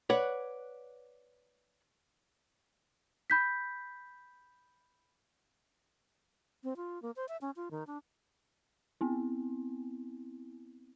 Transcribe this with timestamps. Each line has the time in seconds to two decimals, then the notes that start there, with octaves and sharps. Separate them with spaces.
0.10 B4 C#5 D5 F#5
3.30 B5 G6 B6
6.64 C4
6.77 F4
7.02 A#3
7.16 C5
7.29 E5
7.41 C#4
7.56 F4
7.71 D#3
7.87 D4
9.01 B3 C4 E4